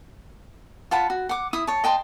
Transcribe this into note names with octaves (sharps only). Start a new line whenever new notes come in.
F4 F#5 A5 B5
F#4
F#5 D6
E4 D#6
C#5 A5
D#5 G5 A5 C6